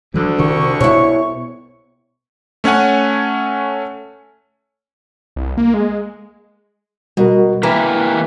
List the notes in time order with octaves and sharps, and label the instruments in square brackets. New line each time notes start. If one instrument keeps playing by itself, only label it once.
[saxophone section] D2 D3 [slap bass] F3 G3
[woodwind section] C2 C#6 [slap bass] C3 D#3 D4
[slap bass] B2 [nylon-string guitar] E4 C#5
[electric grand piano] A3 C#4 C#5 F#5 G#5
[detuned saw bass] C2
A#3
G#3
[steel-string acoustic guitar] B2 [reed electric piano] G3 F#4 A#4
[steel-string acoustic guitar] E3 [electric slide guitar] A#3 G4 B4 [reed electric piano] A#5